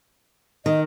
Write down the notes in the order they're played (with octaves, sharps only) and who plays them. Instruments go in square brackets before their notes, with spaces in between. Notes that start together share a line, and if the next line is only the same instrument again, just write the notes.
[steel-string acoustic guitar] D#3 [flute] D#5